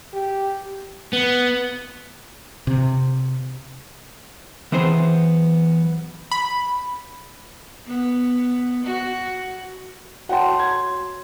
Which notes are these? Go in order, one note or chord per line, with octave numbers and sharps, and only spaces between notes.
G4
B3
C3
E3 F#3 B3 C4 G#4 C5
B5
B3
F#4
F#4 C#5 F#5 G5 A5 C6
G#6